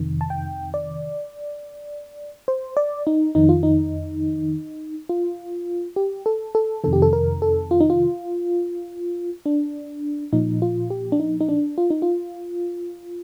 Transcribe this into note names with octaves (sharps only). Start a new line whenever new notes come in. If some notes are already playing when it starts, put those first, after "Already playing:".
Already playing: F2 C3 D#3
A5
G5
D5
C5
D5
D#4
F2 D#3 D#4
F4
D#4
F4
G4
A4
A4
F2 C3 D#3 A4
G4
A4
A#4
A4
F4
D#4
F4
D4
A#2 F3 D#4
F4
G4
D4
D#4
D#4
D4
F4
D#4
F4